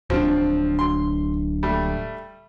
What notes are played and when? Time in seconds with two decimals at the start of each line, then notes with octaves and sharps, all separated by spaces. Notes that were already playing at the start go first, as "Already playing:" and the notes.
0.10 D1 F3 C4 D4
0.79 C6
1.63 G3 A3